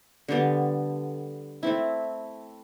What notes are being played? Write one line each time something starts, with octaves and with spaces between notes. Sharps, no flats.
D3 G3 B3
A3 C4 E4